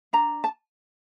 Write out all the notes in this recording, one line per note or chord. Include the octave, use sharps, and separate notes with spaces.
D4 A#5
A5